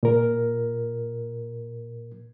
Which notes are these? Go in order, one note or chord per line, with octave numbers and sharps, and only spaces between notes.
A#2 A#4